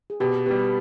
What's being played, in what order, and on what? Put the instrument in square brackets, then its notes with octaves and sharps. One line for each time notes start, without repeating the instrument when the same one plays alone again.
[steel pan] G#4
[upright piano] B2 [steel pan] G4
[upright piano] G3 B3 [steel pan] G4